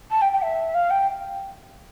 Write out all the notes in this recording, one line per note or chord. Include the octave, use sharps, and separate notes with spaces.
A5
G5
G5
E5
F5
G5